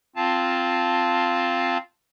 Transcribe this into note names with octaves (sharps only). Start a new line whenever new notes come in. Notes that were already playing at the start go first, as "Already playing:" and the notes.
C4 F4 F5 A5